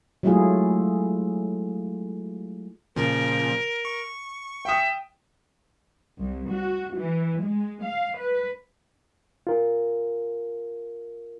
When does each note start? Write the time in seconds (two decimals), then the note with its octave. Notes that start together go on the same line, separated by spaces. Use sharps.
0.23 F#3 G#3 A3 E4 F4 G#4
2.96 A#2 C#3 F3 A#4
3.85 C#6
4.65 E5 G5 D#6
6.20 C2
6.50 F#4
6.97 E3
7.42 G#3
7.84 F5
8.18 B4
9.47 F4 A#4